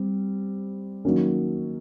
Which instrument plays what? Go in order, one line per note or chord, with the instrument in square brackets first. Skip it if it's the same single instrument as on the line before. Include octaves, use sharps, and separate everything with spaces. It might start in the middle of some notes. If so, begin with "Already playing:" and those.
Already playing: [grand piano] G3 C4
D#3 F#3 A#3 C#4